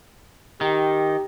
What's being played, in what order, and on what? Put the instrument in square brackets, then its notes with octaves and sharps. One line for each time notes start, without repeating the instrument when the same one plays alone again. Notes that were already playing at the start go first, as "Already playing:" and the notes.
[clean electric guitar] D#3 [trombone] G4